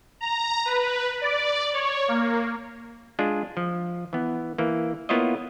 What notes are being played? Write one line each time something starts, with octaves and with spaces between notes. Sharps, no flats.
A#5
B4
D5
C#5
A#3
G#3 D4 F4
F3
E3 B3
E3 A#3
A#3 B3 E4 F4 C#5 D#5